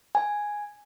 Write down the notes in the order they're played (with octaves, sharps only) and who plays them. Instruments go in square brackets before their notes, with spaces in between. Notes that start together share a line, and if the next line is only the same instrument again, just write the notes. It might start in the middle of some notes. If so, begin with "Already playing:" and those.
[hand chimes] G#5